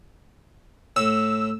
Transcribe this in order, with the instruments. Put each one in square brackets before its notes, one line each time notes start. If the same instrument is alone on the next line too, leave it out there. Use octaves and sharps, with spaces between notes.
[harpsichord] A2 [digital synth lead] E6